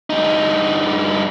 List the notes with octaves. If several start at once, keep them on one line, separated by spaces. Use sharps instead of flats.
G2 D#4